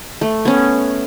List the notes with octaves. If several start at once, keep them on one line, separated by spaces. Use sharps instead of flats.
A3
B3 C#4